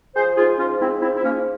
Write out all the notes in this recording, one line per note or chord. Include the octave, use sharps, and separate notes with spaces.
F3 G#4 C5
G#2 F4 G#4
F3 C#4 F4
G#2 C4 E4
F3 C4 E4
E4
G#2 A#3 C#4